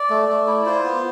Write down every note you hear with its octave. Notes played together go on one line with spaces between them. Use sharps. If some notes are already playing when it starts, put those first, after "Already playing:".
Already playing: D5
A3
A3
E4
F4 C5
B3